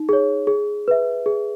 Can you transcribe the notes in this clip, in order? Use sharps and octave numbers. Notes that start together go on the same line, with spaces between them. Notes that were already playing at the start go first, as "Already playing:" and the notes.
Already playing: D#4
G#4 C#5
G#4
B4 E5
G#4